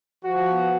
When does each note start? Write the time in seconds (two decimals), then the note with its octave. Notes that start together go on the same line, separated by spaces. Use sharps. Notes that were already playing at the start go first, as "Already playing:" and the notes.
0.24 F3 F#4
0.48 B3